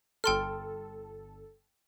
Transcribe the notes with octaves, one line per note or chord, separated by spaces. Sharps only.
G1 A4 G5 C6 F6